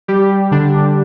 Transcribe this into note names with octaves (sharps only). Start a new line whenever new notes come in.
G3 G4
D3 D4